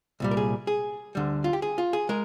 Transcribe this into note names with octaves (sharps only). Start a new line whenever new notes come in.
C2 A#2 G3
A#4
G#4
G#4
D2 D3 G3
F4
G4
G#4
F4
G#4
G#3 A#4